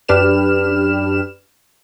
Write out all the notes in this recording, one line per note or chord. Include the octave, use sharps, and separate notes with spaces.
F#2 D4 G4 B4 F6 E7